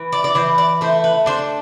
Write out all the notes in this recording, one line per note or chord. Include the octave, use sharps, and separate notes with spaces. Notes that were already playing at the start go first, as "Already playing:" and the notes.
Already playing: E3
D5
D5
E3 C5
D5
A3 C5
B4
D4 C5